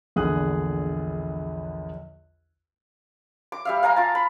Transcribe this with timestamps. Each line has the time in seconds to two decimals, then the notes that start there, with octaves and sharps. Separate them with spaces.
0.16 A#1 E2 D3 G#4 D#6 F#6
3.52 D6
3.65 G3 E5 F5
3.83 F5 G#5 A#5 D6
3.96 F4 A5
4.15 B5